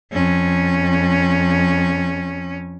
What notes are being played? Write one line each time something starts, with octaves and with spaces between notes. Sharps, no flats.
F2 C#4